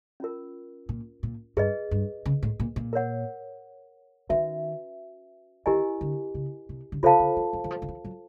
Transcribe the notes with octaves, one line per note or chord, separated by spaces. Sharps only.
C#4 F4 A#4
A#2
A#2
G2 G#4 B4 D#5
G2
C#3
A2
A#2
A#2
A#4 C#5 F#5
D#3 C#4 F#4 B4 E5
D#3 E4 G4 A#4 D#5 G#5
D3
C#3
C3
D3
C#3 F4 A4 C5 F5 A5
D3
E3
E3
E3
F3
D#3
E3
F#3